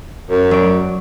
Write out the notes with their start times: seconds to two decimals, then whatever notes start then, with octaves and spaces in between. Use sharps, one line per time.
0.30 F#2
0.51 F#3 D5